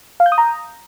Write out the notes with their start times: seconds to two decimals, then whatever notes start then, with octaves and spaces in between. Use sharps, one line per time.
0.20 F5
0.26 G6
0.32 D#6
0.38 A#5